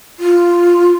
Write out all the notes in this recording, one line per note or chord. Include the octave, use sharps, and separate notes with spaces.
F4